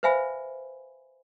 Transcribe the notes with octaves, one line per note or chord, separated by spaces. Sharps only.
B4 C5 E5 F5 G#5 B5